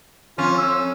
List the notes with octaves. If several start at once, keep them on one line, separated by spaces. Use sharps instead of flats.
F2 C#4 F4
E6